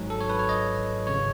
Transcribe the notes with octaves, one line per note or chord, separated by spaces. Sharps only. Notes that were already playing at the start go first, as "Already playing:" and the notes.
Already playing: G#1 G#2 F#3
A4
C#5
B4
C#5
D#5
G#1 C#3 C#5